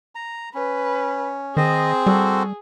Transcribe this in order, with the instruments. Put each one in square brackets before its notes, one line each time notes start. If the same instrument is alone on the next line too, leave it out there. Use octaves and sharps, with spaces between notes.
[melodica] A#5
[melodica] C#4 [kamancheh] B4
[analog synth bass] D#3 [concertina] C4 C5 [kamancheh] G#4 [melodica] D#5
[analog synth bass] G3 [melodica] F#4 A4